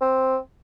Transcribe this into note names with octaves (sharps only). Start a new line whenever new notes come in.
C4